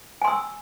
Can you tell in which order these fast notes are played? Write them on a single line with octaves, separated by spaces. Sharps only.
G#5 C6 E6